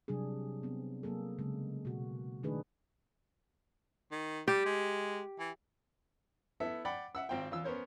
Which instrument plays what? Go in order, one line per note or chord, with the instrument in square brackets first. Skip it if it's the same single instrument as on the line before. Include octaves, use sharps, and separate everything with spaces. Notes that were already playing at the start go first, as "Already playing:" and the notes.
[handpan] C3 F#3 G3 D4 G#4
B3 C4
F#3 A#3 G#4 A4
C#3 G#3
B2 F#4
D#3 A3 D4 D#4 G#4 B4
[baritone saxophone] D#3
[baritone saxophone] G3 [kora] G4
[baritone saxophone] G#3
E3
[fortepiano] B3 E4 A4 E5
D5 F#5 G5 B5
E5 F#5 E6
G#1 C4 F4 G5
E2 F4 E6
B3 C#4 A#4 C5 C#5